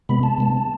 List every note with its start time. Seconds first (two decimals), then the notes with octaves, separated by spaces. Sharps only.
0.09 C3 G#3 B3 B5
0.23 A5
0.38 C3 G#3 B3